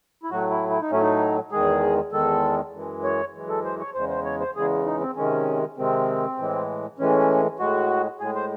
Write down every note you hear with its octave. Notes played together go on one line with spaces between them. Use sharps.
E4
A2 F#3 A3 F#4
E4
E4
D#4
A2 F#3 A3 C#4
D#4
E2 D#3 G#3 G#4
E2 D#3 G#3 A4
F#2 E3 G#3
C#5
F#2 E3 G#3
A4
C5
C#5
E2 C#3 G#3 C5
C5
C#5
C5
E2 C#3 G#3 G#4
D#4
C4
C3 D#3 G#3 C#4
C3 D#3 G#3 C4
A2 E3 G#3
A2 E3 G#3 C#4
A2 G#3 F#4
A2 G#3 G#4
C5